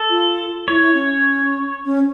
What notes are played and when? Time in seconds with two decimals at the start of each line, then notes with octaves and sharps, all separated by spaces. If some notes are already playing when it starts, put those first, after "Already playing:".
Already playing: A4
0.10 F4
0.68 E4 C#5
0.81 E4
0.94 C#4
1.85 C#4